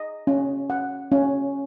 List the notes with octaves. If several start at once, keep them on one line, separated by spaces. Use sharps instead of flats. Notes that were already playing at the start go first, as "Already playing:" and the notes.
Already playing: D#5
C#4
F#5
C#4